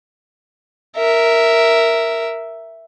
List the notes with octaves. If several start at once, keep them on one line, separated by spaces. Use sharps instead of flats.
A#4 E5